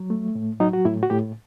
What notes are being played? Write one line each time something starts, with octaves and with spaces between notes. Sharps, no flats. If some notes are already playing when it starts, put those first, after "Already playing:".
Already playing: F#3
A3
A2
F#3 D#4
F#4
A2 E4
F#4
A2 G4